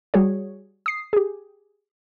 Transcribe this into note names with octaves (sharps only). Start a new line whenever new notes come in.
G3 F#4 G#4 C#5
D#6 C7
G4 G#4